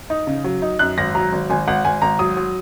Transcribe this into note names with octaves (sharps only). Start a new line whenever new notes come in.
D#4
C#3
F#3
D#4
F#2 F#6
G#1 A#6
F#3 A#5
G#1
G#1 G#5
G#1 F#5
G#1 G#5
G#1 A#5
F#3 D#6
F#3